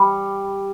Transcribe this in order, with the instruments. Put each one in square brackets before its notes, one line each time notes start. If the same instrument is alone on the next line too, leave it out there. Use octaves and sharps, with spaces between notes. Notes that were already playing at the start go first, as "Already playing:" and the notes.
Already playing: [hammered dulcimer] G3